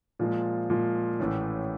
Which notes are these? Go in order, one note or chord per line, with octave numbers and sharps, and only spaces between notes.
A#2 F3 G#3
A#2 F3 G#3
A1 A2 E3 A3 C#4